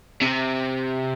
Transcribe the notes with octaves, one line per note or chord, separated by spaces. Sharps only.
C3